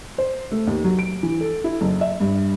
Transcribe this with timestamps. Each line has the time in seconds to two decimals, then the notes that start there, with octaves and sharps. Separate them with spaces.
0.18 C5
0.52 A3
0.67 D#2
0.84 F#3
0.99 D7
1.23 E3
1.41 A4
1.64 E4
1.81 F#1
2.01 E5
2.20 G2